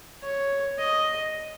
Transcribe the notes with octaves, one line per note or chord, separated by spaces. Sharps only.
C#5
D#5